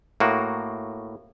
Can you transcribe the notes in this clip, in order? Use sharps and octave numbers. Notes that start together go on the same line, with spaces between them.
A2 A#3 F#4